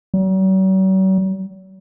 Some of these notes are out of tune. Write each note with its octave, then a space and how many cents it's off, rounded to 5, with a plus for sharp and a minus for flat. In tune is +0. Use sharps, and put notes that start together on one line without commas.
F#3 +45